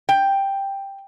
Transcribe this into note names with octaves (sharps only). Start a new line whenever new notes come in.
G5